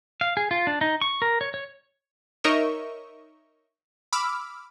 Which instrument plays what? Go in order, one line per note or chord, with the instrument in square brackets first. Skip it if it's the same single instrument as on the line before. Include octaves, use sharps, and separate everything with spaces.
[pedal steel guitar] F5
G#4
F4
D4
D#4
C#6
A#4
C#5
C#5
[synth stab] D#4 A#4 C#5 D#5 E5 C#6
B5 D6 E6 F6